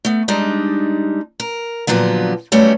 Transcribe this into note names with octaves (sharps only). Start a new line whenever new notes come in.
A3 B3
G3 G#3 D4 D#4
A#4
A#2 D3 F3 F#3 B3
F#3 G3 A3 B3 C#4